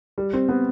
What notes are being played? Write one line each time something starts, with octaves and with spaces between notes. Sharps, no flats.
G3
C4
B3